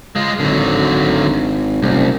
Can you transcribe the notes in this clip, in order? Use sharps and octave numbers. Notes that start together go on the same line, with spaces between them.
G#3 F4
G#1 D3 F#3
F#1 C2